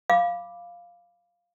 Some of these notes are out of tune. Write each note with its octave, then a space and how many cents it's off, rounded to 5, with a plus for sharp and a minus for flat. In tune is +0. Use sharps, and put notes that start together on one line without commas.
F5 +0 B5 +0 D6 +0